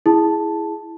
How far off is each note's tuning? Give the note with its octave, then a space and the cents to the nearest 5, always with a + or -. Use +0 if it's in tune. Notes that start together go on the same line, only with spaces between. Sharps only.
E4 +0 G#4 +0 A5 +0